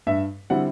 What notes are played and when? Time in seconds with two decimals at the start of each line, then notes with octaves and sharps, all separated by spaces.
0.07 G2 E5
0.50 D3 G3 C4 E4 F#5